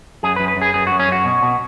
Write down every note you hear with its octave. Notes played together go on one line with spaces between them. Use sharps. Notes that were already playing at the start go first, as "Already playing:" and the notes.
F#2 G#4
B4
F#2
B4
F#2 G#4
F#2 G#4
F#4
F#2
C#4
F#2 F#4
B2
B2